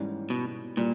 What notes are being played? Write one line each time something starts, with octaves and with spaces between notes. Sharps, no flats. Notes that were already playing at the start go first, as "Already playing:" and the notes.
Already playing: G#2 E3 G3 C#4
B2
A#2 G3